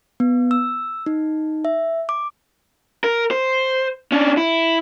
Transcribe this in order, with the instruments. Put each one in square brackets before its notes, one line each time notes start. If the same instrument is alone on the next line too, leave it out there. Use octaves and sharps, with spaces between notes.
[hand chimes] B3
E6
D#4
E5
D6
[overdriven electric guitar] A#4
C5
C#4 D4
E4